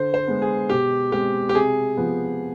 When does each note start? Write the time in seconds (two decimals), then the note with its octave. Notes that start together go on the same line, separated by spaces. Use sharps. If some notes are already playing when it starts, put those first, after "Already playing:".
Already playing: D3 C5
0.14 C5
0.27 G#3 B3
0.42 G#4
0.69 B2 G4
1.12 G#3 C4 G4
1.49 G4
1.55 C3 G#4
1.97 F3 B3